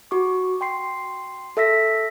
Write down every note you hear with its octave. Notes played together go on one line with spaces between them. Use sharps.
F#4 C#6 D6
G5 C6 C7
A4 E5 E6 A#6 B6